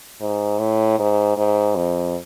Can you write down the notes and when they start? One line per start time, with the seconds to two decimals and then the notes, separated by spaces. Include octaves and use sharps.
0.20 G#2
0.59 A2
0.99 G#2
1.37 G#2
1.75 F2